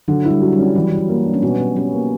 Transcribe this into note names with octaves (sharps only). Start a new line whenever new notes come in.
D3 F#3
E4
G3
F#3
G3
C#4
E3 F#3
E3
F#3
A#3
D4
C#4
B2 B3
B2
G3 C#4
A#3